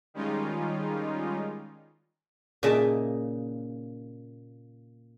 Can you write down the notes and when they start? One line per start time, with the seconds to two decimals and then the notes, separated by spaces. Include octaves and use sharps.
0.14 D#3 G3 G#3 C#4 D#4 F4
2.63 A#2 C#3 D#4 D#5 E5 A5